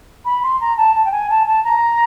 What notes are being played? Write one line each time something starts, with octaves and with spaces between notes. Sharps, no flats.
B5
C6
A#5
A5
A5
G5
G#5
A5
A5
A#5